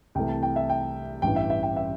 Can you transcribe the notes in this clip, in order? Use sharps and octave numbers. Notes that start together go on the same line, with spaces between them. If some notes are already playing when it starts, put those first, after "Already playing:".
C2 C3 E3 A3 G5
A5
G5
E5
G5
A1 G2 E3 G5
E5
E5
G5
E5